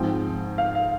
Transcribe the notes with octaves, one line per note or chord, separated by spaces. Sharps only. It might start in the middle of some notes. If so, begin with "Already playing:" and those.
Already playing: G#2 F3 C4 G5
F5
F5